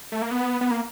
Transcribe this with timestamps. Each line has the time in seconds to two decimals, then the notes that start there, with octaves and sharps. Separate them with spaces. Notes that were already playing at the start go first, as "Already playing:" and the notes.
0.12 A3
0.22 A#3
0.31 B3
0.61 B3
0.71 A#3